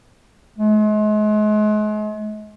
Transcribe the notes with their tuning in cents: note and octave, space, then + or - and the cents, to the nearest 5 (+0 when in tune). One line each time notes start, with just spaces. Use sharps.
G#3 +35